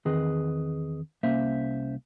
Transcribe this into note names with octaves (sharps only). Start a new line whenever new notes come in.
E2 D#3 C4 G#4 B4 D#5
C2 A#3 C#4 C5 E5